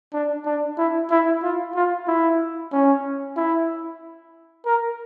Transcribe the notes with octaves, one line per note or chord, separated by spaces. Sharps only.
D4
D4
E4
E4
F4
F4
E4
C#4
E4
A#4